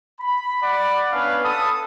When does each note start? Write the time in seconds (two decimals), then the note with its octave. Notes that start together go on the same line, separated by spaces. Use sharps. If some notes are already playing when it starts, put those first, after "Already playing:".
0.20 B5
0.61 D5 F#5 B5
1.11 B3 C#4 D4 B4 F5
1.43 A4 A5 B5 D#6